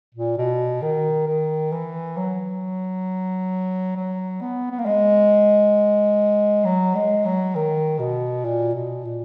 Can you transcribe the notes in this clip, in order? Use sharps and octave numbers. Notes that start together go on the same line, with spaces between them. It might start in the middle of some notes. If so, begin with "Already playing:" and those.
A#2
B2
D#3
D#3
E3
F#3
F#3
B3
B3
A#3
G#3
F#3
G#3
F#3
D#3
B2
A#2
B2
A#2